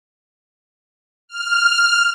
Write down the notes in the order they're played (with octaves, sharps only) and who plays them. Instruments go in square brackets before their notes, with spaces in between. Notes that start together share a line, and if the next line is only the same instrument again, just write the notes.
[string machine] F6